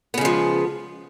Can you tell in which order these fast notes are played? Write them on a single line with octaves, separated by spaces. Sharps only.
B3 C#3 G#3 F3